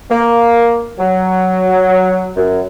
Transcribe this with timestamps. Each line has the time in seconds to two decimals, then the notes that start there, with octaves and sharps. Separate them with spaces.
0.10 A#3
0.99 F#3
2.37 F#2